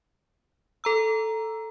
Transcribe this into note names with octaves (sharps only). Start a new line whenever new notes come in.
A4 A#5 E6